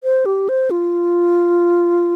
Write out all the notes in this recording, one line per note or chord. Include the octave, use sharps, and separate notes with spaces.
C5
G4
C5
F4